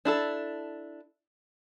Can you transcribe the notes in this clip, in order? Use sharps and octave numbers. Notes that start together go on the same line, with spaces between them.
D4 E4 A4